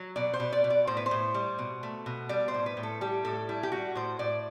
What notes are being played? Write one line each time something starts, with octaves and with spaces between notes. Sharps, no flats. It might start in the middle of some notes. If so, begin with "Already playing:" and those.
Already playing: F#3
B2 D5
C5
B2
D5
B2
D5
A2 C5
B4
C5
A2
G3
B2
A3
B2
G3 D5
C5
A2
B4
A2
A4
G3 G4
A2 A4
G3 E4
G4
G3 F#4
A2 C5
A2 D5